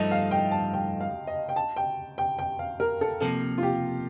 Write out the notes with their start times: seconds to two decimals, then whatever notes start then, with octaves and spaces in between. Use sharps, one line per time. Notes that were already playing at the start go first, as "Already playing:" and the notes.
Already playing: G2 F3 A3 D#4 A4 D#5
0.11 F5
0.31 G5
0.51 A5
0.73 G5
1.01 F5
1.27 D#5
1.49 G5
1.56 A5
1.76 G5
2.18 G5
2.39 G5
2.59 F5
2.80 A#4
3.01 A4
3.21 C3 F3 A#3 A4
3.58 F4
3.63 G4